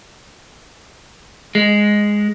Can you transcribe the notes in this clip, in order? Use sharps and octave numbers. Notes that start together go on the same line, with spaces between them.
G#3